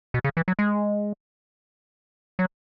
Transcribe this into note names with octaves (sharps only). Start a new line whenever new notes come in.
B2
C#3
E3
F#3
G#3
F#3